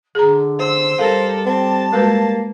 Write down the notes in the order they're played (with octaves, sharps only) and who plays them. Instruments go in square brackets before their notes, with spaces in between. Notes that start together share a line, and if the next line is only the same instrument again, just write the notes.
[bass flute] D3 [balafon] G#4 A#5
[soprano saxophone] C5 [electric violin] E6
[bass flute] G3 [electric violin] A4 A#4 [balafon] F5
[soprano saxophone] C4 [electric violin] A5
[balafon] G#3 F#4 B4 [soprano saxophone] A#3